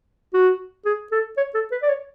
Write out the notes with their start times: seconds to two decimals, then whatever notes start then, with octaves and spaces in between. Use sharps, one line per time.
0.34 F#4
0.85 G#4
1.12 A4
1.37 C#5
1.55 A4
1.72 B4
1.83 D5
1.89 C#5